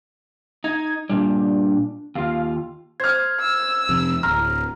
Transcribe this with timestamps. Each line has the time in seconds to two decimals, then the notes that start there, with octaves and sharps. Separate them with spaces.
0.64 D#4 G#6
1.09 A#2 G3 D4
2.15 D#2 F4 F5
3.00 C5 F6 G#6
3.40 E6
3.89 F2 C3
4.23 D1 A#5 F6